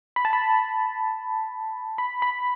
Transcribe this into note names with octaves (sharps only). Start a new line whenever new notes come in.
B5
A5
B5
B5
B5